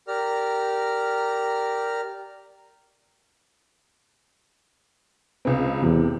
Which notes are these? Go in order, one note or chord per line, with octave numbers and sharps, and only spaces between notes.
G4 A#4 D5 A#5 F6
C#2 B3 C4
E2 C3